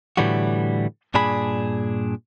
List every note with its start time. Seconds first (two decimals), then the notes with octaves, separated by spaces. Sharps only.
0.17 A2 D3 E3 G3 A3 F#4
1.14 G2 A#2 D4 G#4 B5